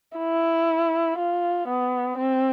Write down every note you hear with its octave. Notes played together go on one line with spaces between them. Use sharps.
E4
F4
B3
C4